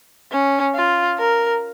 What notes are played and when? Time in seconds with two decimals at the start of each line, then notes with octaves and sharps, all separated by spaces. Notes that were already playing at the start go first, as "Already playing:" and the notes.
0.32 C#4
0.75 F4
1.19 A#4